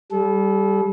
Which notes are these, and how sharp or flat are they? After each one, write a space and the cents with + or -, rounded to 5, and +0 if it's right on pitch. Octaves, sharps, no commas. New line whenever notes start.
G3 +0 A4 -35